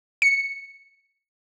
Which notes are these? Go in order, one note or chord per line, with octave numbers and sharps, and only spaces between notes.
C#7